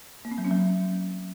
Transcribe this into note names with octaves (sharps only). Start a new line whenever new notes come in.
A#3
C4
F#3
C#4
F#3